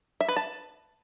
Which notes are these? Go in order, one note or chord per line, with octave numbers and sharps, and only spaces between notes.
E5
B4
A5